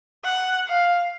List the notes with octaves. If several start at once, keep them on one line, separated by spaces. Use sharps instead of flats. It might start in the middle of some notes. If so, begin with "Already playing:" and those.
F#5
F5